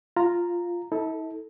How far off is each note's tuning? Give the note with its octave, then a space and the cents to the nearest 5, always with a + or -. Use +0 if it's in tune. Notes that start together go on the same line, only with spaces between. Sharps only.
F4 +0 F5 +0 A#5 -5
E4 -45 A4 +0